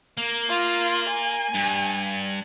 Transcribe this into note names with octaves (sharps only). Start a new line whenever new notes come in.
A#3
F4
G#5
G2